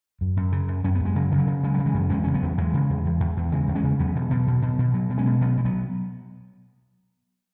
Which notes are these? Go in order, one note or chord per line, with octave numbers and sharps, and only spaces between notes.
F#2
F#2
C#3
F#2
F#2 C#4
B3
F#2 G#3
C#3 F#3
C#3
F#3
C#3
C#3 G#3
C#3 F#3
E3 G#3
F#2
E2 G#3 C#4
C#3 C#4
F#3 B3
E2
E2 E3 G#3
C#3
E2
E2
E2
E2
C#3 E3 G#3
E2
G#3 C#4
C#3
E2 F#3 B3
B2
B2
B2
B2
B2
B2 F#3
B2
G#3 C#4
B2
B2 F#3 B3
B2 G#3
F#3 B3